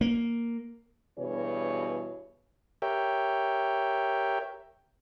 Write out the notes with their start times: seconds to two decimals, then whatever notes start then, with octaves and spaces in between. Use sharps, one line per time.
0.01 A#3
1.18 G2 B2 E3 G#4 C#5
2.82 G4 A#4 C#5 E5 G5